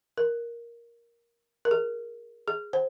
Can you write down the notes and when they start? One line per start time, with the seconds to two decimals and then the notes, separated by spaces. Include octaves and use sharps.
0.17 A#4
1.65 A#4
1.71 G#4
2.48 G#4
2.73 C5